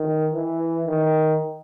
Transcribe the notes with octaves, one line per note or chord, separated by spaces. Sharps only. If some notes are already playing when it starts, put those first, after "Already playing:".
Already playing: D#3
E3
D#3